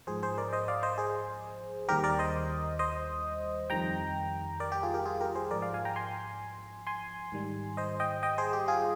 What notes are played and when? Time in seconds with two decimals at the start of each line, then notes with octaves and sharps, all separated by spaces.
0.07 G#2 F3 G#4 C5
0.23 G#4 C5
0.38 A#4 D5
0.53 C5 D#5
0.68 D5 F5
0.83 C5 D#5
0.98 G#4 C5
1.89 D#2 D#3 G3 G4 A#4
2.04 A#4 D5
2.19 C5 D#5
2.79 C5 D#5
3.70 F2 D#3 G3 G5 A#5
4.60 A#4 D5
4.72 G4
4.83 F4 G#4
4.94 G4 A#4
5.05 F4 G#4
5.21 G4 A#4
5.35 G#4 C5
5.50 G#2 F3 A#4 D5
5.62 D5 F5
5.74 F5 G#5
5.85 G5 A#5
5.96 G#5 C6
6.87 G#5 C6
7.32 G#2 D#3 G3
7.77 C5 D#5
8.00 D#5 G5
8.23 D#5 G5
8.38 G#4 C5
8.53 G4
8.68 F4 G#4